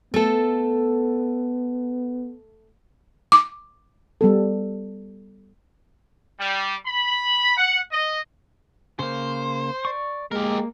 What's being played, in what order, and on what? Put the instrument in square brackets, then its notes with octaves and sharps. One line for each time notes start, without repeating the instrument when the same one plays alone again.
[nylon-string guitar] A3 A4 [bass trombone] B3
[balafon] D6
[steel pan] G3 B3 A4
[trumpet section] G3
B5
F#5
D#5
[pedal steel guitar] C#3 A#3 [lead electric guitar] C5
[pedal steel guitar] D5 C#6
[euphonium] G#3 [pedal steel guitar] A#3 [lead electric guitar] G4 A#4